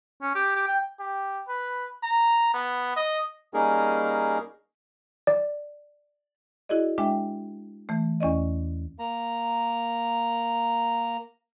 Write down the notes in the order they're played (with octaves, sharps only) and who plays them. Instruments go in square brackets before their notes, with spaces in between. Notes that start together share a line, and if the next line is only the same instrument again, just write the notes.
[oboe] C#4
G4
G4
G5
[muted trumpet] G4
B4
A#5
B3
D#5
[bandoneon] G3 A#3 C#4 D#4 G#4 A#4
[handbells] D5
[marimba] E4 F#4 G#4 D5 D#5
G#3 D4 E5 G5
E3 A3
E2 C#4 D5 D#5
[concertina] A#3 A#5